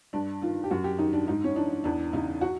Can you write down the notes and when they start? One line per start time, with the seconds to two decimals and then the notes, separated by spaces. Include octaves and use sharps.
0.13 G2 D4
0.41 D#3 F4
0.64 G4
0.71 F#2 F#4
0.84 G4
0.99 D#3 D#4
1.13 D4
1.28 G#2 D#4
1.44 C#4
1.56 E3 D4
1.84 E2 D4
2.13 C#3 E3 D#4
2.41 F#4